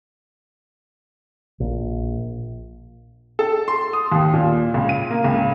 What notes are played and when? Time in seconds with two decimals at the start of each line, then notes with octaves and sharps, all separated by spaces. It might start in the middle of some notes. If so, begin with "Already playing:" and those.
1.60 A#1
3.39 A4
3.68 C6
3.93 D#6
4.12 D#2
4.34 A#2
4.74 C#2
4.89 D#7
5.10 A#3
5.24 C#2